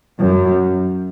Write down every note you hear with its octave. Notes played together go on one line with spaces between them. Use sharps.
F#2